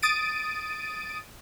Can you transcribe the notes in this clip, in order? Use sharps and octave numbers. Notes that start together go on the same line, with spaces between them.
D#6 A6 D7 D#7